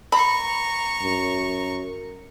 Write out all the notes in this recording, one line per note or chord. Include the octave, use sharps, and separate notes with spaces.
A#5 B5 C#6
F#2